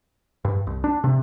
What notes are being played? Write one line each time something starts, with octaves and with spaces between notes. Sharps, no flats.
G2
C2
D4
C3